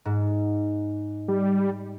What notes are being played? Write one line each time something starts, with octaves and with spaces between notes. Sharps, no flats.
G#2
G3